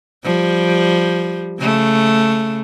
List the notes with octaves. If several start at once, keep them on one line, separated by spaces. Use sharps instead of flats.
F3 G3
C#3 A3